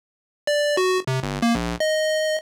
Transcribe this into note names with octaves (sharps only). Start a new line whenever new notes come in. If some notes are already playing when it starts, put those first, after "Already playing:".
D5
F#4
C3
G1
A#3
A#1
D#5